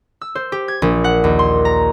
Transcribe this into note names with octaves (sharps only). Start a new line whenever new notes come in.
E6
C5
G4
G#6
A#1
F#5
D#2
C6
A#5